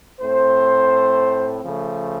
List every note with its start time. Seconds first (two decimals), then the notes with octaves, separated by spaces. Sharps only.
0.20 A2 A3 C4 C5
1.64 C#3 F3 A3